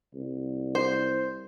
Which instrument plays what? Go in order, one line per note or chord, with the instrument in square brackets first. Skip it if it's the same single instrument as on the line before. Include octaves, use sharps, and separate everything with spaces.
[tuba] C2
[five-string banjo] C5